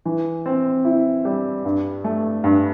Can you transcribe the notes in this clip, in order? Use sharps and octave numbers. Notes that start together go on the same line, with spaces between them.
E3
C4
E4
G3
G2
A3
G2